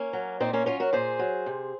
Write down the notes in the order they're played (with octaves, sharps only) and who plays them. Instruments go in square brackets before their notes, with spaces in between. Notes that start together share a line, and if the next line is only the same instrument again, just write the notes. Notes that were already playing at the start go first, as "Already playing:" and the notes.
Already playing: [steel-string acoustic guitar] A#3 C#4
F#3
A#2 C4 D#4
A#3 C#4
F#3 C#4 F4
F#4 A#4
A#2 G#4 C5
F#3
C3